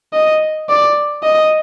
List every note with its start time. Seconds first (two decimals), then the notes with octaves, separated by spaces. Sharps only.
0.14 D#5
0.69 D5
1.23 D#5